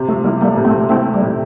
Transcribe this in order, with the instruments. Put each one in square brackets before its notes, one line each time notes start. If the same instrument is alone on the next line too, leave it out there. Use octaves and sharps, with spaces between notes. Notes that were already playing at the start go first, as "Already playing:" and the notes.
Already playing: [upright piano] C3
[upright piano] F3 [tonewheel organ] A3
[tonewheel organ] G3 A#3 [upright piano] E4
[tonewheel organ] G3 A#3 [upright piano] A3
[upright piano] C3
[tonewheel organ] A3 C4
[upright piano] F3
[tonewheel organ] A3 C4 [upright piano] E4
[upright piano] A3
[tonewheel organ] G3
[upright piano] C3